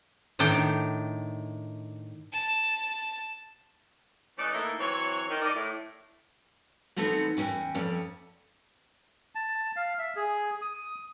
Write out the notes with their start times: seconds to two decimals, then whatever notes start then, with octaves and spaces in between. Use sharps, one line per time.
0.39 A2 D#3 D4 G5
2.33 A5
4.38 E3 A3 C#4 D#4 B4 D5
4.53 A2 A#3 D#4 E4 A4
4.79 E3 F#3 C4 C#5
5.28 D#3
5.42 D#4 A4 A#4 D5
5.54 A2
6.96 E3 A3 B3 C4 D#4
7.37 E2 F3 C#4 G5
7.75 F2 C#4 D5
9.35 A5
9.76 F5
9.99 E5
10.16 G#4
10.62 D#6